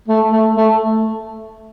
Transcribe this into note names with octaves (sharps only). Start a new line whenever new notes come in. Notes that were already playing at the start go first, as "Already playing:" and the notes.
A3
A3
A3